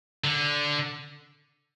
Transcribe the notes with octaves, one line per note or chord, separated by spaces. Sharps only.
D3